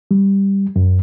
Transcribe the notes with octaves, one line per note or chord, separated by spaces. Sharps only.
G3
F#2